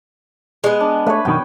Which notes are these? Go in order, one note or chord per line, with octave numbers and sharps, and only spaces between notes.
G#3 B3
D4
A3 B4 C#5
F#2 B2 D#3 G5